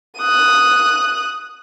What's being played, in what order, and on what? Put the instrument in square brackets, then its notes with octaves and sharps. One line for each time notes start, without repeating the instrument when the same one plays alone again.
[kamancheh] D#6 F#6